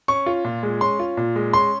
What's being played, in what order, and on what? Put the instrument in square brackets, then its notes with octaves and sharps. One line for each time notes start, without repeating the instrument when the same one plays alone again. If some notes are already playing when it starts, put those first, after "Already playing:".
[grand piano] C#4 C#6
F4
A#2
G#3
C#4 C6
F4
A#2
G#3
C#4 C6